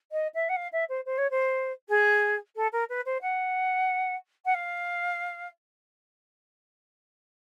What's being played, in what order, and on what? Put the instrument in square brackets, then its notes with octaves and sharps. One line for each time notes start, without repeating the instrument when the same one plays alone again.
[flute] D#5
E5
F#5
F5
E5
C5
C5
C#5
C5
G#4
A4
A#4
B4
C5
F#5
F#5
F5